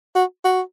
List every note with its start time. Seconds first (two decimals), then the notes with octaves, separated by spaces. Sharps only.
0.15 F#4
0.44 F#4